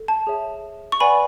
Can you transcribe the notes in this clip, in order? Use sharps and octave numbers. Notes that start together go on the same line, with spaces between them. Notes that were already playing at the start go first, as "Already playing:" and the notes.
Already playing: A4
A5
G#4 C#5 E5
C#6
B4 D5 F#5 G#5 B5